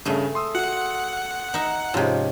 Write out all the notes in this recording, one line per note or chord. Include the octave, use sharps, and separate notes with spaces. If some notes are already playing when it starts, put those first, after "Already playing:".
G2 C#3 A3 G#4 E5
C6 D#6 E6
F#4 F#5
D#4 E5
G#2 C3 F3 C#4 F4 G4